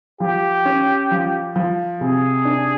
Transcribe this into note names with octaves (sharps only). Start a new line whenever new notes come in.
F3 G4
C#4
F3
F3
C3 G#4
D4